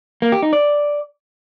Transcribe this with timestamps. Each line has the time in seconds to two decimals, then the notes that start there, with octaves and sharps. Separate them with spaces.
0.22 A#3
0.32 G4
0.42 D#4
0.53 D5